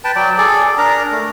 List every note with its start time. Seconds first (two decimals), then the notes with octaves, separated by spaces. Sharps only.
0.04 B4 G5 A5
0.16 F#3 D5 G5
0.38 G#4 A4 D5
0.78 D4 A#4 A#5
1.12 A3